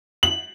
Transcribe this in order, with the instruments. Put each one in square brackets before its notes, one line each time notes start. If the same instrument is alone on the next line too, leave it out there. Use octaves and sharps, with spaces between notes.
[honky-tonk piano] F#7